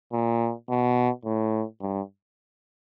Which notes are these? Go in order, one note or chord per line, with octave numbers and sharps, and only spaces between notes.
A#2
B2
A2
G2